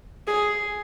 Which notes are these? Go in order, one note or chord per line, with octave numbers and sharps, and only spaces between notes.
G#4